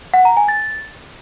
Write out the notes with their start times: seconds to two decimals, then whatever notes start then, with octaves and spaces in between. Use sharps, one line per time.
0.14 F#5
0.25 A#5
0.37 G#5
0.48 A6